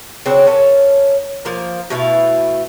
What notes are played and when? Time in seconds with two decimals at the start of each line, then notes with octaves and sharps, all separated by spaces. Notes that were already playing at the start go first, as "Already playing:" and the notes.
0.26 C#3 F#3 C4 D4
0.47 C#4 A4 A#4
1.45 F3 A#3 A#4
1.90 B2 A3 E4 F5